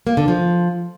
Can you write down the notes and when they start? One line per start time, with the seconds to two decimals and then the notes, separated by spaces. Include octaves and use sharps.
0.07 A#3
0.17 D3
0.28 F3